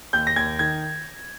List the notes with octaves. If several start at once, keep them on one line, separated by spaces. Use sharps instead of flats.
D#2 G6
A#6
D#2 G#6
D#3 G#6